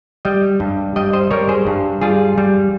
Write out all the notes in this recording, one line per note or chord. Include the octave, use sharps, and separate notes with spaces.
G3 D#5 G5
G2
G3 D#5 G5
C5 D#5
G3 A#4 C#5
G#4 C5
G2
G3 F4 G#4
G3